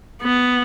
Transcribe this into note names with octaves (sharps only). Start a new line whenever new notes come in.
B3